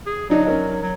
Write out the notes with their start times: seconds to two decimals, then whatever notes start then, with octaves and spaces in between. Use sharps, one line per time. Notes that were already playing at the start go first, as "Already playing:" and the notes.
0.06 G#4
0.30 F#3 D4 D#4 D5
0.45 C#4 A#4 D#5
0.82 F#3